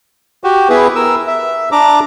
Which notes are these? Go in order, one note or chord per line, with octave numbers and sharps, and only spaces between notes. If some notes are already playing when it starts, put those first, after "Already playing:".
F#4 G4
B3 E4 G#4 B4
A#4 E6
E5
D4 A#5 D6